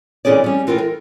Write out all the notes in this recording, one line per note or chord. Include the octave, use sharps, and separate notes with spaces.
A#2 E3 C#4 G#4 D5
G3 C#4
E3 F4 A#4 G5
A#4